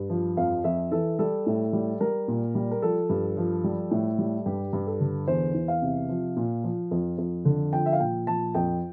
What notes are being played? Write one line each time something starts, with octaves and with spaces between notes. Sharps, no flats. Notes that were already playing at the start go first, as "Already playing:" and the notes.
Already playing: G2
F3
F2 F5
F2 E5
E3 A4
G3 A4
A2
G3
G3 A#4
A#2
G3
A#4
F3 A4
G2
F3
G3
A2
G3
G2 G4
G2
A4
D3
E2 C5
E2
F5
C3
F3
A#2
F3
F2
F2
D3
F3 G5
E5
F5
A#2 G5
F3 A5
F2 G5